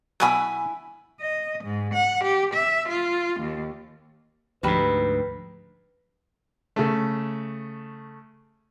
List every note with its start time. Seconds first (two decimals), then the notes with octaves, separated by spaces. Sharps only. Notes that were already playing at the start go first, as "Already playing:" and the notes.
0.20 B2 F#3 E4 G#5 B5
1.21 D#5
1.64 G#2
1.94 F#5
2.24 G4
2.53 E5
2.88 F4
3.40 D#2
4.63 D2 G#2 F3 D#4 G4 B4 B5
6.76 C#3 A3